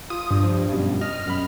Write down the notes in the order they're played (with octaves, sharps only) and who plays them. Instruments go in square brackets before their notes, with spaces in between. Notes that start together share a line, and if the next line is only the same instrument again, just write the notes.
[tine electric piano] F4 [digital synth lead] D#6
[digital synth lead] G2
[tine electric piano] F3
F#2 B2
[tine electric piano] D#5 [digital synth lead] F6
[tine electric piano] F#2 B5